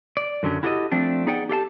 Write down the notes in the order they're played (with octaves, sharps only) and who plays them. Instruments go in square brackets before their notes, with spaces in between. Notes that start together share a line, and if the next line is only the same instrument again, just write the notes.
[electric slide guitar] D5
F#2 D3 F#3 C#4
E4 F#4 G4 A4 D5 D#5
F3 A3 C4 D4
B3 D#4 G#4 D5 F#5 G5
G4 A4 F5 A5